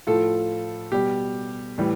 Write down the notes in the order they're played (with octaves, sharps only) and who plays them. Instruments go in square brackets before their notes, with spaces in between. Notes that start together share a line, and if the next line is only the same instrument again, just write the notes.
[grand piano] A2 F3 F4 A4
B2 G3 G4
A2 E3 G3